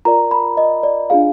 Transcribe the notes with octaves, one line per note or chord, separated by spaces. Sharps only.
F4 A#4 D5 A#5
B5
D#5
D5
D4 F4 G#4 F5